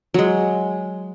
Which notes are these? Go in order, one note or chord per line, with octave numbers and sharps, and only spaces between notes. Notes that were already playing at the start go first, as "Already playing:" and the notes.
F#3 G#3